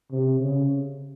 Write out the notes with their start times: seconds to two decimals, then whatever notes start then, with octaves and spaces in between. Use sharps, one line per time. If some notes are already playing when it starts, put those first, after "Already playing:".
0.11 C3
0.39 C#3